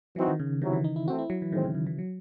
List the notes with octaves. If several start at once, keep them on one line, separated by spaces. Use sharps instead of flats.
E3 F#3 C4 D#4 F#4
D#3
C#3
C3 D#3 F#3 C#4 E4
E3
D#4
E4
E3 A3 C4 F#4
E4
F#3
E3
A2 D#3 G#3 C4
C#3
C#3
E3
F#3